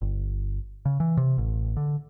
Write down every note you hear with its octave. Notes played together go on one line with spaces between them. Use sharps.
G1
C#3
E3
C3
A1
D3